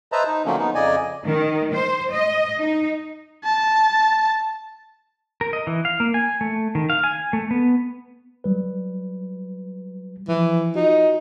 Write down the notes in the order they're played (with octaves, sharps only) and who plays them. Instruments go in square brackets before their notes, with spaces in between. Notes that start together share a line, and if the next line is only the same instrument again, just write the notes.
[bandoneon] B4 C5 D#5 E5 A5 A#5
D#4
D3 F3 F#3 A3 A#3 C#4
B3 D#4
F2 C#3 D5 D#5 G#5
[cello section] D#3
C5
D#5
D#4
[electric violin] A5
[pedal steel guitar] A#4
D#5
E3
F5
A#3
G#5
A3
D#3
F5
G#5
A3
B3
[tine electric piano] F#3 G3 B4
[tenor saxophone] E3 [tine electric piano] F3
[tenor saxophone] D#4 [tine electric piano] F4 F#4